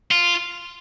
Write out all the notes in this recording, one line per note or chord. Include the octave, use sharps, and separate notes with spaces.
F4